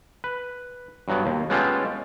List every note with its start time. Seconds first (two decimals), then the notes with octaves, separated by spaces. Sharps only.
0.24 B4
1.08 G2 F#3 B3
1.26 D#2
1.50 G#3 B3 C#4 F4 G4 A4